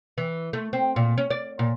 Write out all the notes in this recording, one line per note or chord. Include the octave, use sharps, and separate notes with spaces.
E3
A3
C4
A#2
C#4
D5
A#2